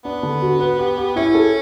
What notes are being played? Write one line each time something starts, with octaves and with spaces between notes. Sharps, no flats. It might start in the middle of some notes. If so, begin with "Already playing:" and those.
B3 D4
D3
F#4
B4
G4
G4
C#4 E4
A4